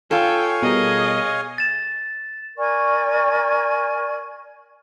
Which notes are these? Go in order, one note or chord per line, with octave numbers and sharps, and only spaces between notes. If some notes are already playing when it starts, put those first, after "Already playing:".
F4 A4 C#5 F5 G5 G#5
B2 G3 G#4 A#4 D#5
A6 E7
A#4 D5 G#5 C#6